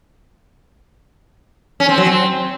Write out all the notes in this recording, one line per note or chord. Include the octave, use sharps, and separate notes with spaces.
C#4
C4
F#3
C4